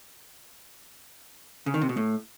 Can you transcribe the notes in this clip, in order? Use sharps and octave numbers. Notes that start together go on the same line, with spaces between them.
C#3
D#3
C3
B2
A2